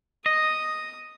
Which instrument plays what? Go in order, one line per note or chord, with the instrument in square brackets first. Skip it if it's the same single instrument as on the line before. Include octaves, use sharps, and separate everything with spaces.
[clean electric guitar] D#5 [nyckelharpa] D#6